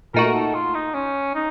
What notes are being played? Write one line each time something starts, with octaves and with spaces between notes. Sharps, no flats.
A#2 A3 D#4 F#4 A#4
A4
F4
D#4
C#4
D#4